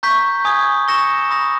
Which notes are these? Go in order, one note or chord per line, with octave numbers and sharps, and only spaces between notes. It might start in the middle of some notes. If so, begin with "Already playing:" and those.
A#5 C#6 G6 B6
G#5 D#6 G#6
C#6 E6 A#6 C#7 E7
B5 D#6 A#6